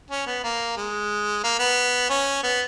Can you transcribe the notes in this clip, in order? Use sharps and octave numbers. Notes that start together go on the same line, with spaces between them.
C#4
B3
A#3
G#3
A#3
B3
C#4
B3